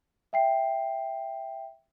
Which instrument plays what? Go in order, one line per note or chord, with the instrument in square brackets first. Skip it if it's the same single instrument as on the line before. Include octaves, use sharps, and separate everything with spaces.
[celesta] E5 G5 C7